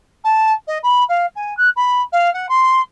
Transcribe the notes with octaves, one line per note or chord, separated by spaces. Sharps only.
A5
D#5
B5
F5
G#5
F#6
B5
F5
F#5
C6